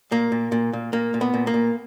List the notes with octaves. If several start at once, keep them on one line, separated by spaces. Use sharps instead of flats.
A#2 A#3
A#2
A#2
A#2
A#2 A#3
A#2
B3
A#2
A#3
A#2